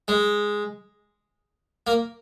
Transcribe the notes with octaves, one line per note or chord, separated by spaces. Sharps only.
G#3
A#3